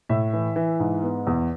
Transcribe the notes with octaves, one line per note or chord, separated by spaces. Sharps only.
A2 E5
E3
E3
G#2
B3
E2